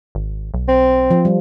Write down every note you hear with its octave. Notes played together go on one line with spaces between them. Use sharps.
G#1
B1
C4
F3
G3